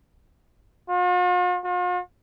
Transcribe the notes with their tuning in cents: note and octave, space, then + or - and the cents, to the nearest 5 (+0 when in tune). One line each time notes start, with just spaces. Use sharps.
F4 +45
F4 +45